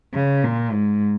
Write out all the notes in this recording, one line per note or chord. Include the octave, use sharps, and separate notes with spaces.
C#3
A#2
G#2